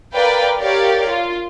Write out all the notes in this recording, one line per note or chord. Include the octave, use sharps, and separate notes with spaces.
A#4 B4 D5 F5 G5
G4 A#4 C#5 D5 F5
F4